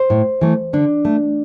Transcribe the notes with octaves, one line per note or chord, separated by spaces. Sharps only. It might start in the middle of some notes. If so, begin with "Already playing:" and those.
Already playing: C5
A2
E3 A3
D3 D4
A3